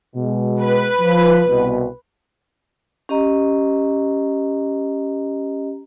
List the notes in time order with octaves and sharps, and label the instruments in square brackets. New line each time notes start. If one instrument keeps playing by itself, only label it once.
[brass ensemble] B2 G#3
[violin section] B4
[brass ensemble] F3
C2 B2
[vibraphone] C#4 G4 D#5 A#5